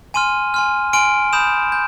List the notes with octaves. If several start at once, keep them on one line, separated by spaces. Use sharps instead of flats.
G#5 C6 F6 D#7
G#5 C6 F6
G#5 C6 F6 D7
B5 D#6 G6 E7
G6